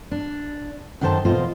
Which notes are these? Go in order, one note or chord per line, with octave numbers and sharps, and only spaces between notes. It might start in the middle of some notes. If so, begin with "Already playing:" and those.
D4
F#2 D#3 D#4 A4 C5 A5
E2 B2 F4 C5 D#5